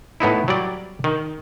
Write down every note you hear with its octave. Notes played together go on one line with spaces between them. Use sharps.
A2 B3 D#4 E4
F#3 G3 D5
D#3